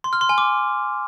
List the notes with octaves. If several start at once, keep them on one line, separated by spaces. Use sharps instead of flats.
C6
F6
C6
G#5
D6